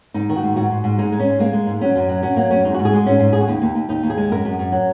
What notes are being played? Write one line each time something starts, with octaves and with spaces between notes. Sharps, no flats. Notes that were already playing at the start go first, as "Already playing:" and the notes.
G#2 D#4
D#3
F#4
G#2
G#2 F#4
G#2
G#2
G#3 D#4
G#3
C#4
G#2
G#3 A#3
G#3
G#2
F#3 C#4
F#2
F#3
F#3 C#4
F#3 A#3
F#2 C#4
G#3 D#4
F#4
G#2
G#4
G#3 F#4
G#2 C#4
G#2
G#2 G#4
F#4
D#2 D#4
D#2
D#2
D#2 D#4
D#2
G#4
G#3
F#2 A#4
F#2
F#2
F#3